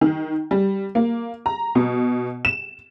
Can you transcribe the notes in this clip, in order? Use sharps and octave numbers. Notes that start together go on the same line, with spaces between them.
D#3
G3
A#3
A#5
B2
E7